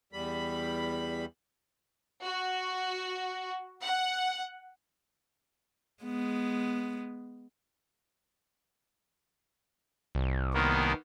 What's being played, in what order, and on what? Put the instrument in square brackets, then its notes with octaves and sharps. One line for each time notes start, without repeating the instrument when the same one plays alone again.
[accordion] E2 G3 B5
[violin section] F#4
F#5
[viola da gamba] G#3 B3
[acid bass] C2
[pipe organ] D#3 A#3 B3